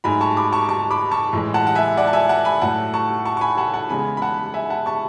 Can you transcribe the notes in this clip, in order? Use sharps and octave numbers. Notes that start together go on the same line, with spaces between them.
G#2 F#3 A3 G#5 B5
A5 C#6
B5 D6
A5 C#6
A5 C#6
B5 D6
A5 C#6
A2 E3 G#3
F#5 A5
F#5
E5 G#5
D5 F#5
A5
E5 G#5
F#5 A5
G#5 B5
A2 F#3 A3 F#5 A5
A5 C#6
A5 C#6
C#6
G#5 B5
F#5 A5
F#5 A5
E2 C#3 G#3 G#5 B5
B5
F#5 A5
E5 G#5
F#5 A5
A5 C#6